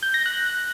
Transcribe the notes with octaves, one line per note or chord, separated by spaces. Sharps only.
G6
A#6
F#6